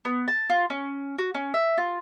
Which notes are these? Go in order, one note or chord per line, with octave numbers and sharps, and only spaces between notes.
B3
A5
F4
C#4
F#4
C#4
E5
F4